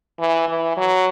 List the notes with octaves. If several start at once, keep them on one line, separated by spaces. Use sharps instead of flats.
E3
E3
F#3